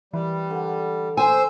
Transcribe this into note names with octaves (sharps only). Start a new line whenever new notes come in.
E3 G3 B4
D3
C5 G#5 E6